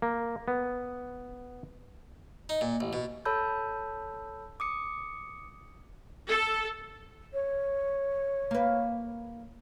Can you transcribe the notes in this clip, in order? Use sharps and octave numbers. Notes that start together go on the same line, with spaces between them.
A#3
B3
D#4
A#2
A1
B2
A4 C#5 A5 B5 E6 G6
D6 D#6 C#7
A4
C#5
A#3 B4